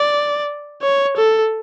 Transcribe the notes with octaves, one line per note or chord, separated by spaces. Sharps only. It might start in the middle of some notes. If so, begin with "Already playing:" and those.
Already playing: D5
C#5
A4